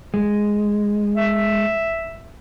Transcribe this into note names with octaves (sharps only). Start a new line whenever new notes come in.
G#3
E5